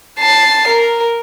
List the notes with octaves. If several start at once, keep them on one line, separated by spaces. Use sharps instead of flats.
A5 C7
A#4